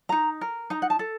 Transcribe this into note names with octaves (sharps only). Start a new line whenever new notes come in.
D#4 A#5
A#4
D#4 A#5
F#5
A5
A4